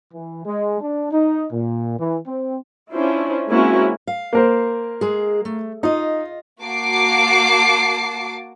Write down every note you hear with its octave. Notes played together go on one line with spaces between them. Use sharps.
E3
G#3
D4
D#4
A#2
E3
C4
C#4 D4 E4 F4 C5
G#3 A#3 C4 C#4 E4 F#4
F5
A#3 A#4 C5
G#3 G#4
A3
D#4 F4 D#5
A#3 F#4 A5 D6 C7